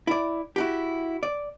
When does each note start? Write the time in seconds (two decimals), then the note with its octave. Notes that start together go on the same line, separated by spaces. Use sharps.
0.07 E4 D5
0.56 E4 F#4 G4
1.23 D5